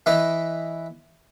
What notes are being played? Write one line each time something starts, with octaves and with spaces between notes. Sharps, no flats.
E3 E4 B4 D#5